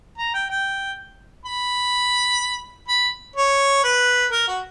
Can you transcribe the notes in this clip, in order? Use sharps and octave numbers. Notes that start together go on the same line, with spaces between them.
A#5
G5
G5
B5
B5
C#5
B4
A#4
F#4